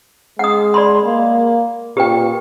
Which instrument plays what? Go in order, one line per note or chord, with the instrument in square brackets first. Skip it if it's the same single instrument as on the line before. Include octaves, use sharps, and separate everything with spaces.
[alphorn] G#3 [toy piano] F#5 D#6
[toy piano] D5 B5 C6
[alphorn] A#3
[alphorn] A#2 [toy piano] G4 B4 G5